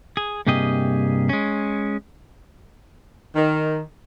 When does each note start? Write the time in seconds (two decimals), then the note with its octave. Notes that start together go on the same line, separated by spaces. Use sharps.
0.17 G#4
0.47 G2 C3 A#3 G4 G#4 D#5
1.29 G#3 C#4
3.34 D#3